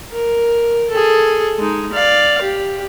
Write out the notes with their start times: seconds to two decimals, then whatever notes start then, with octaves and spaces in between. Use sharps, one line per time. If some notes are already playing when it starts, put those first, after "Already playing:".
0.11 A#4
0.90 G#4 A4
1.59 G#3 D#4
1.93 D5 F5
2.42 G4